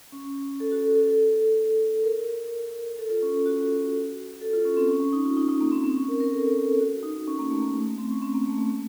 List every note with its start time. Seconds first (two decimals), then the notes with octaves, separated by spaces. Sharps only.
0.12 C#4
0.60 A4
0.71 F#4
0.84 A4
0.95 A4
2.04 A#4
2.99 A4
3.10 F4
3.23 C#4
3.46 F#4
4.42 A4
4.53 F4
4.65 C#4
4.77 C4
4.89 C#4
5.00 C#4
5.13 D#4
5.24 F4
5.37 D#4
5.48 D#4
5.61 A#3
5.72 C4
5.83 C4
5.95 C#4
6.08 A#4
6.20 A#4
6.32 A4
6.43 A#4
6.55 A4
6.80 F#4
7.03 D#4
7.28 C#4
7.39 A#3
7.50 A3
7.62 A#3
7.74 A3
7.86 A3
7.98 C4
8.10 C#4
8.22 C4
8.34 A#3
8.46 A3
8.58 A3
8.69 A3